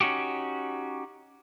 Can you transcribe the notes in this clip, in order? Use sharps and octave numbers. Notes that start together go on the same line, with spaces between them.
C#4 D#4 F#4 G4